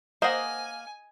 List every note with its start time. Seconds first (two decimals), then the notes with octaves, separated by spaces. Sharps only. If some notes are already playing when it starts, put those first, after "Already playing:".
0.22 A#3 C5 D#5 F#5 G#5